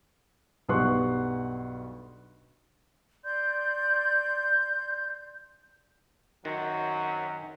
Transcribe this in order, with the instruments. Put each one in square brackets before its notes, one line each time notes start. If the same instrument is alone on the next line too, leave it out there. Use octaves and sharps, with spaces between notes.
[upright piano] B1 G2 B3 C6 C#6 F#6
[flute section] D5 C6 G6
[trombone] F#2 [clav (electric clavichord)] D#3 [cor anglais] F#3 [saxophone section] C4 C#4 F#4